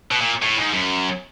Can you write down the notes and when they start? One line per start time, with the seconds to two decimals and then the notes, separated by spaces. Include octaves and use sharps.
0.11 B2
0.21 A#2
0.42 A2
0.57 G#2
0.74 F#2